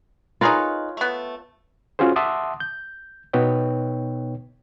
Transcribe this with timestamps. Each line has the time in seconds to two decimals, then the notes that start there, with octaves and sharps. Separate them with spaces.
0.41 D#4 F4 G#4 A#4 B4 C#5
0.97 A3 B3
1.99 C#4 F4 F#4 G#4 C5
2.16 E5 F#5 A5 C6 D6 D#6
2.60 G6
3.33 B2 B3 D#4 B4 C#5 G5